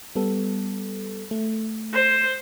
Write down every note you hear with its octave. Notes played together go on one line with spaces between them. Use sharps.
G3 B3 A4
A3
C5